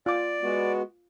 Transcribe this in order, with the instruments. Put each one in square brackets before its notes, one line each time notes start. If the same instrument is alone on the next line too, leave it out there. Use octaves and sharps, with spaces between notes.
[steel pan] F4 D6 [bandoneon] D5
[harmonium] G#3 B3 F#4